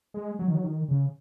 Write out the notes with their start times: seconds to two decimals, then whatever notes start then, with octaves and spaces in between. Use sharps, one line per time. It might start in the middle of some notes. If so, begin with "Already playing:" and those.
0.14 G#3
0.39 F#3
0.48 D#3
0.55 F#3
0.64 D#3
0.89 C#3